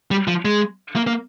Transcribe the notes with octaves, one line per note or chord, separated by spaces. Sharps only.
G3
F3
G#3
A#3
A#3